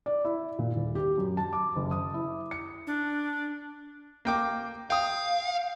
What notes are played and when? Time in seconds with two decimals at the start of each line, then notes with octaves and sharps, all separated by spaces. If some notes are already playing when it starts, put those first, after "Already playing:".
0.06 D5
0.25 E4
0.59 A#2
0.76 D#1
0.95 G4
1.18 F#2
1.37 A5
1.53 D6
1.76 F#1
1.91 D#6
2.14 E4
2.51 C#7
2.87 D4
4.25 A#3 G5 D6
4.90 F5 G5 D#6